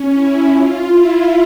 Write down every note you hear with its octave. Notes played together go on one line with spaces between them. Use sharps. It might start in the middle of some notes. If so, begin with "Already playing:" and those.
Already playing: C#4
E4
F4
E4